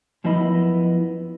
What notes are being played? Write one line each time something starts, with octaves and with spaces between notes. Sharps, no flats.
F#2 F3 B3 E4 D#5 B5